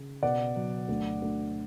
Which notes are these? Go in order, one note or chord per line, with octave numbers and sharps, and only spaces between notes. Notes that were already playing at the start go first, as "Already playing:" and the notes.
Already playing: C#3
B2 D5 F#5
F#3
D2
D2